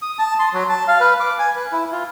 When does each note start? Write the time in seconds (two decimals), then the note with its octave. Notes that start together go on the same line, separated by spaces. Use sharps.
0.02 D#6
0.19 A5
0.39 C6
0.53 F#3
0.69 A5
0.88 F5
1.01 B4
1.20 D6
1.39 G#5
1.56 B4
1.72 E4
1.92 F4